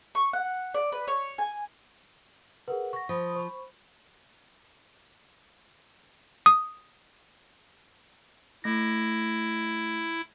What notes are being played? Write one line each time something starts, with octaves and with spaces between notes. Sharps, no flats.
C#6
F#5
D5
B4
C#5
G#5
G#4 A#4 B4 F#5
C#6 A#6
F3 B5 D#6
C5 B5 C#6
D#6
A3 E4 A#6